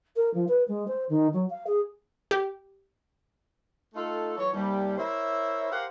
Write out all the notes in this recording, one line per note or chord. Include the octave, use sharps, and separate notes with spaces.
A#4
F3
B4
G#3
C5
D#3
F#3
F5
G#4
G4
A3 D#4 F4 A4
E3 F#3 C#5
D#2 C3 G3
E4 A#4 C5 C#5 E5
G4 A#4 C5 F5 F#5